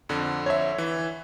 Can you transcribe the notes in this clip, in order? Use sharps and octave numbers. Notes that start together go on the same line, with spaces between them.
F2 D3
C#5 E5
E3